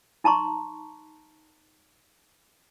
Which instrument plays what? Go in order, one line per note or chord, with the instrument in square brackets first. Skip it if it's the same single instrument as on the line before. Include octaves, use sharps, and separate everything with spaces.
[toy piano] D#4 A5 A#5 C6 C#6